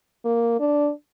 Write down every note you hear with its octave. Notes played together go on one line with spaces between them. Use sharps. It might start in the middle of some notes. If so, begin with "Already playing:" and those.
A#3
D4